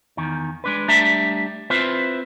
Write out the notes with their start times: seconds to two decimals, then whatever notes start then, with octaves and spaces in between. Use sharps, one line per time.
0.17 E2 D#3
0.64 G#3 D4 B4
0.88 G3 A3 D4 E5 A#5
1.70 C4 E4 F4 B4 C5